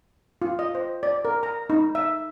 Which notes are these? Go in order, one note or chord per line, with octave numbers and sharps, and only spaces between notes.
F4
D#5
C5
D5
A#4
A#5
D#4
E5